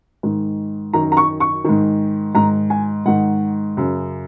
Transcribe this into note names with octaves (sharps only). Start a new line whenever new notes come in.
G#2 D#3
F#2 D#3 A#5
A#5
C#6
C#6
G#2 D#3
G#2 D#3 A#5
G#5
G#2 D#3 F#5
F#2 C#3